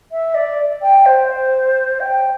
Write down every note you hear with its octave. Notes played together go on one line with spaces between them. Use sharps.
E5
D5
G5
C5
G5